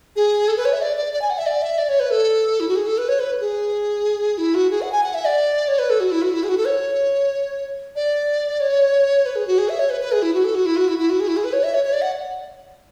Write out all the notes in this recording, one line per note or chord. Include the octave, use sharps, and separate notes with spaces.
G#4
A4
B4
C#5
E5
D5
D5
D5
G#5
F#5
E5
D5
E5
D5
C#5
B4
A4
E4
F#4
G#4
A4
B4
C#5
B4
G#4
E4
F#4
G#4
F#5
G#5
F#5
E5
D5
C#5
B4
A4
F#4
E4
F#4
E4
G#4
F#4
A4
C#5
D5
C#5
B4
G#4
F#4
G#4
E5
C#5
B4
B4
G#4
E4
F#4
A4
F#4
E4
F#4
E4
E4
F#4
G#4
E4
G#4
B4
C#5
E5
C#5
C#5
D5
F#5